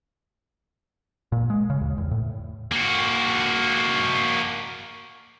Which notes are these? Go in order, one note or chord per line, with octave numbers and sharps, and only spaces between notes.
A#2
G#3
C#3
D#2
E2
A2
A#3 F#4